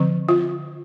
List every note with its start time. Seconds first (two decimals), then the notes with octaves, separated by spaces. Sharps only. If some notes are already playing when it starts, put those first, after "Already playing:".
Already playing: D3 F3 C4
0.29 F4